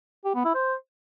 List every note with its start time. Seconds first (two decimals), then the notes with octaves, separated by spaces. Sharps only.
0.25 G4
0.35 B3
0.45 E4
0.55 C5